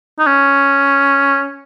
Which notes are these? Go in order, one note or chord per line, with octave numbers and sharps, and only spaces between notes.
D#4
C#4